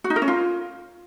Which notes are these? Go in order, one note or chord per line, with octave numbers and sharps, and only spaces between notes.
F#4
D#4
A#4
C#4
F4